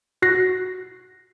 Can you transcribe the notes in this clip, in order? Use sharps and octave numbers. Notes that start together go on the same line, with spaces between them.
F#4 F#6 A#6 C7